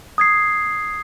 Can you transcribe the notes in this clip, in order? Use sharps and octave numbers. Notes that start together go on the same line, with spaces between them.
D#6 G#6 C7